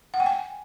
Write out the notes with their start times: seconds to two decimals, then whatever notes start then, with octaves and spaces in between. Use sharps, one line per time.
0.14 F#5
0.20 G5
0.26 G#5